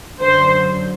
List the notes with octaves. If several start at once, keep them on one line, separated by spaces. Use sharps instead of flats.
F#2 D3 F#3 C5